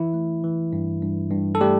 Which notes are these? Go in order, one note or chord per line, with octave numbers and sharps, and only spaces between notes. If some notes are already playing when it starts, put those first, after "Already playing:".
Already playing: E3 E4
A3
E3
G2
G2
G2
A4
G3 A3 G4